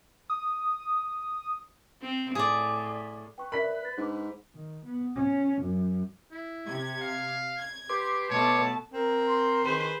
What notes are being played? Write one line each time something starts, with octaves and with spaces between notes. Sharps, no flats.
D#6
C4
A2 G#4 D5
B4 G5 C#6
A#4 D5 E5 B5 B6
A6
G#2 D4 D6
D#3
B3
C#4
F#2
E4
C3 G#6
F5
G#6
G4 B4 C6 D6
B2 A3 B3 C#5 A5
C4 A#4
C6
D#3 G#4 B4 C5